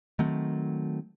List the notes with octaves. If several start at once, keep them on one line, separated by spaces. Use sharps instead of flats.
D#3 F#3 A3 C4